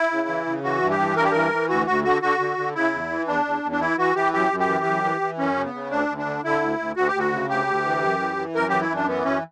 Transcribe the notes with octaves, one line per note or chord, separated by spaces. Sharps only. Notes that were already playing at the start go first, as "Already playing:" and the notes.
Already playing: E4
C#3
E3
C#3
E3 F#4
G2
G4
E3
G2 A#4
G4
E3 A#4
E3
D2 F#4
D2 F#4
D3 F#4
D3 F#4
D3
D3
C#3 E4
E2
E3
E2 D4
E2
E2
D4
E3 E4
E3 F#4
E3 G4
F#2 G4
F#2
G4
E3
F#2
E3
E3
F#2 C#4
C#3
B3
C#3
D2 D4
D2
D4
D3
D3 E4
D2
D2
D2 F#4
G4
D2
F#4
C#3
D2 G4
D2
E3
F#2
E3
E3
F#2 A#4
E3 G4
E4
F#2 D4
E3 B3
F#2 C#4